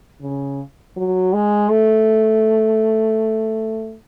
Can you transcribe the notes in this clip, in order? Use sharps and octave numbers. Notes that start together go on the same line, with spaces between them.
C#3
F#3
G#3
A3